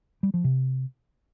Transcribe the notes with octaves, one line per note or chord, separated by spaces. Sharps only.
G3
F3
C3